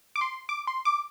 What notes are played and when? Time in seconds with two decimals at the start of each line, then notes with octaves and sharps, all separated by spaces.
0.16 D6
0.21 C6
0.49 D6
0.67 C6
0.85 D6